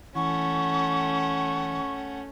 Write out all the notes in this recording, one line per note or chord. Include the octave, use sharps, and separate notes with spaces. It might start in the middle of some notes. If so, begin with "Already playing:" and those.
E3 A3 C#4 F#5 C#6